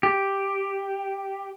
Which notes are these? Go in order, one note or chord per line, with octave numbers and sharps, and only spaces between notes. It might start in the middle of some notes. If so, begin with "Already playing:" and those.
G4